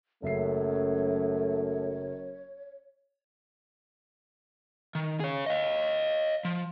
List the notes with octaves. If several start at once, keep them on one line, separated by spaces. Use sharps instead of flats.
F#1 F#2 A3 C#5 E5 C7
D#3
G#4 C#5
D#5 F5
F3